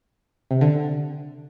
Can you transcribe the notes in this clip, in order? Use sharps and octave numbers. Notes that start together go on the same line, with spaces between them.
C3
D3